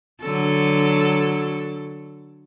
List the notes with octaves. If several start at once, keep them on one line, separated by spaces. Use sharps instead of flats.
D3 F#3 A4